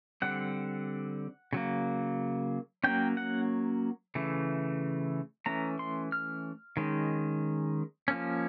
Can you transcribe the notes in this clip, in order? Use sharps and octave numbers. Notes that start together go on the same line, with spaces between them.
D3 G3 C4 F#5
C#3 F#3 A#3
F#3 A#3 C#4 G5
F#5
C#3 E3 A3
E3 A3 C#4 A#5
C6
F6
D#3 G#3 C#4
F3 A#3 C#4